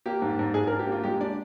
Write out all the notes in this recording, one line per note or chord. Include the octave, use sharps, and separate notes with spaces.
A#3 G4
G#2
G#2
G#2 G#4
A#4
D4
G4
A#3
F4
G#3 G4
D4 D5